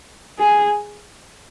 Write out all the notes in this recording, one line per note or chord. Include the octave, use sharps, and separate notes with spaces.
G#4